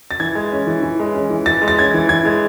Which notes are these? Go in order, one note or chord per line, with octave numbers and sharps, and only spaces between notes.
A6
E3 G#6
G#3
C#4
E3
E3
G#3
C#4
E3
E3 A6
G#3
A6
C#4 G#6
E3
E3 G#6
G#3